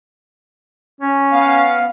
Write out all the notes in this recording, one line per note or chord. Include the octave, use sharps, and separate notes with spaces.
C#4
B3 F5